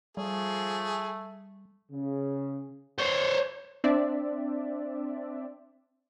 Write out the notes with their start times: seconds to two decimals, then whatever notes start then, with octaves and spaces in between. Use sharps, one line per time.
0.17 F3 G3 A3 G#4
1.91 C#3
2.98 C5 C#5
3.84 C4 D4 D5 E5